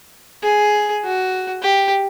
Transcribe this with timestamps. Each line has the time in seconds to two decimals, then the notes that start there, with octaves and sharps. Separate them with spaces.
0.43 G#4
1.04 F#4
1.62 G4